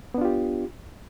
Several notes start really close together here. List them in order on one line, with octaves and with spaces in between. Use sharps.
B3 D4 F4 G4